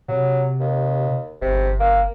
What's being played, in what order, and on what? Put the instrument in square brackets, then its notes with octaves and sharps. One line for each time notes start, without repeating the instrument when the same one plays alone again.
[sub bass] C3 [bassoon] F#3
[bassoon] D#2
[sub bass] G1 [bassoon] C3
[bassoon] A#3